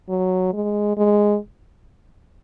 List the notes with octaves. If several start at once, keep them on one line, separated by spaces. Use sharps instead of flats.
F#3
G#3
G#3